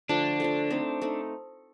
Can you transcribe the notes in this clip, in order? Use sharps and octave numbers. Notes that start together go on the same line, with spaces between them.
D3 F3 A3 D4
D3 F3 A3
A3 C4 D#4
A3 C4 D#4